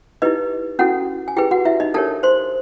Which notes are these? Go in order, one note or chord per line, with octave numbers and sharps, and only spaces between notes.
D#4 E4 G4 B4 D#5
C#4 E4 F#4 A4 F#5
G#5
E4 G4 G#4 B4 G5
F#4 F#5
E4 E5
D#4 D#5
D4 G4 A4 A#4 C#5 A5
C5 C6